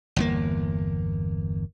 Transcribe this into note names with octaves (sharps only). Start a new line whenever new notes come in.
G1 E2 A#3